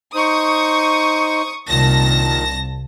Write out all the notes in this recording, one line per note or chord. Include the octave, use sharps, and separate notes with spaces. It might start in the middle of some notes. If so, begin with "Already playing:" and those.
D#4 C5 C#6 D#6
C2 A#2 D#3 A5 A#6